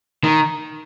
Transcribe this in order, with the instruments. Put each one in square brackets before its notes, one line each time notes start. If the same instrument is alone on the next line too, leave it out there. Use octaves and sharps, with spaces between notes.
[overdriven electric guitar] D#3